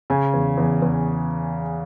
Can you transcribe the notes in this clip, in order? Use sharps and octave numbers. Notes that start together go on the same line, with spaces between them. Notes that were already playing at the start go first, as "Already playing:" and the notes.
C#3 G#5
E2
E2
E2